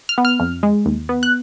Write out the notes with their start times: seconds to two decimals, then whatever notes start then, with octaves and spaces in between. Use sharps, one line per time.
0.09 F6
0.18 B3
0.25 F6
0.40 F2
0.63 G#3
0.86 D#2
1.09 B3
1.23 F#6